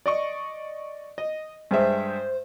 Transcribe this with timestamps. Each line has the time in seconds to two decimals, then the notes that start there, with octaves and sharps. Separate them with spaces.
0.06 D5 D#5 C#6
1.18 D#5
1.71 G2 G#3 C5 E5